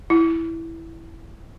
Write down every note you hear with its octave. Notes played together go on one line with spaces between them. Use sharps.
E4